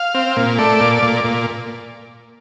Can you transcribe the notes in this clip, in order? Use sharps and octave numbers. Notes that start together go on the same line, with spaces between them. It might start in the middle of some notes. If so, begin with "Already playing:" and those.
Already playing: F5
C4
A#2
A3 D5
A#2
A#2
A#2